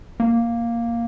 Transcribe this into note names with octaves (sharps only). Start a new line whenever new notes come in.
A#3